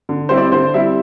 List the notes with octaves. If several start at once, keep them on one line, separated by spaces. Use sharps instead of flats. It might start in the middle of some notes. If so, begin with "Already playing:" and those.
D3
G3 C4 E4 C5
D5
D3 C5
G3 C4 E4 E5